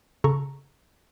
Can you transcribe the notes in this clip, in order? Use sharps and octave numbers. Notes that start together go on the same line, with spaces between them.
C#3 A4 A#5 C#6